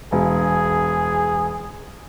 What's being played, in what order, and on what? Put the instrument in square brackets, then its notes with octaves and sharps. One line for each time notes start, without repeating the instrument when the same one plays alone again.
[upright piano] E1 [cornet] G#4